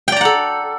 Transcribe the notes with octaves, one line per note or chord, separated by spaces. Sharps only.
A4 D5 F#5 G5 A#5